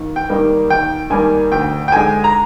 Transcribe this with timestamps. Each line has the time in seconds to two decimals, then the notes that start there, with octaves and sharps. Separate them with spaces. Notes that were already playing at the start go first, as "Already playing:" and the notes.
Already playing: D#2
0.16 G5
0.29 D#3 G3 A#3
0.70 D#2 G5
1.10 D#3 G3 A#3 G#5
1.52 D2 G5
1.88 G5
1.92 D3 G#3 G#5
2.24 A#5